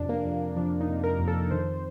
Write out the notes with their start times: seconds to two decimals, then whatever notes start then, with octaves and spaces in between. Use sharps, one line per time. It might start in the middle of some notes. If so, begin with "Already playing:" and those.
Already playing: F2 C3 D4
0.09 A#3
0.25 F2
0.56 F3 D4
0.81 D#4
0.88 C3
1.04 A#4
1.19 F2
1.28 A4
1.51 D#3 C5